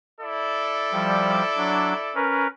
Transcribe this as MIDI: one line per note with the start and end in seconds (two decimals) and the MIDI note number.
0.21 2.20 64
0.21 2.20 69
0.21 2.20 74
0.92 1.42 53
0.92 1.42 55
1.57 1.93 54
1.57 1.93 62
2.15 2.47 61
2.15 2.47 70
2.15 2.47 71